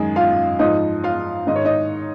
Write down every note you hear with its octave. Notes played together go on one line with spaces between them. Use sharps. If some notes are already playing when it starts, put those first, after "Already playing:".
Already playing: F#2 D#3 G#3 G#4
F4 F5
G#2 F3 D#4 D#5
F4 F5
G#2 D#3 D#5
C#5
D#4 D#5